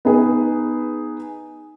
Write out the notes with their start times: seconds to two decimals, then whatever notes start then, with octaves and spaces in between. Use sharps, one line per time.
0.05 B3 D#4 G#4 B4